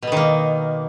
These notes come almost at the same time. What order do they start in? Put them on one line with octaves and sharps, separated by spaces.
B2 B3 D#3 A#3